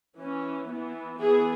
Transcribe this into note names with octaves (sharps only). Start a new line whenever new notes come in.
E3 C#4
E3 B3
E3 B3 G#4